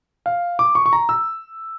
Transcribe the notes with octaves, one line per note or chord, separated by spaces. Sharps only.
F5
D6
C#6
C#6
A#5
E6